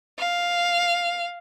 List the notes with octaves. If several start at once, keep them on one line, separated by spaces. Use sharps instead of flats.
F5